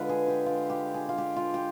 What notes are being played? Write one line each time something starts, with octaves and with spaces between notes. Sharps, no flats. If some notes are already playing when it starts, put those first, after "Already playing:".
Already playing: D3 G#3 F4 B4
G#4
G4
F4
G4
G#4
F4
G4
F4
G4